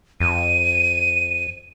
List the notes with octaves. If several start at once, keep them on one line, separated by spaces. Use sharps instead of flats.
F2 D#7